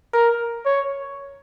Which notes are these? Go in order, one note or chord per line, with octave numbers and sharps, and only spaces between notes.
A#4
C#5